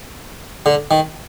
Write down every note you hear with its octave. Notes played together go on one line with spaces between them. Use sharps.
D3
D#3